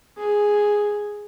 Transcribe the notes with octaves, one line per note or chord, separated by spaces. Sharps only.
G#4